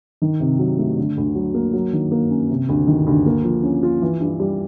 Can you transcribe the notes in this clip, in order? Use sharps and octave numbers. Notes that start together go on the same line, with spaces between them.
D#3
C3
F#3
A3
D3
D2
F#3
A#3
F#3
D#3
A#3
C#4
C3
D2
D#3
D2
A#3
F3
C#4
F4
E3
G2
G3